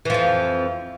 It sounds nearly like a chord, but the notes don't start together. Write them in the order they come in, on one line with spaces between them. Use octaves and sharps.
E3 F3 F2